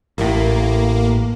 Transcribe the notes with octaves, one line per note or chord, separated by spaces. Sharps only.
A1 A2 A#3